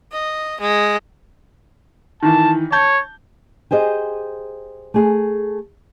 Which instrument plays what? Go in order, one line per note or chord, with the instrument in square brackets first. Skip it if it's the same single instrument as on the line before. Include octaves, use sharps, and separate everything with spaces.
[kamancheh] D#5
G#3
[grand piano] D#3 E3 [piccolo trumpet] A5
[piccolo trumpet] C#5 [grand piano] A5 G6
[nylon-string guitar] G4 G#4 C5 D#5
A3 G#4